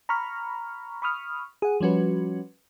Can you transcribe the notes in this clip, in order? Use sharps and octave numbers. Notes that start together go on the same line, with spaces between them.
A#5 B5 C#6 F6
B5 C#6 D#6 F6
G#4 F#5
F3 G3 C#4 F#4 B4